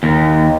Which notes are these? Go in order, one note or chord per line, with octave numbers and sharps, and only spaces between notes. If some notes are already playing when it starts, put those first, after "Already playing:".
D#2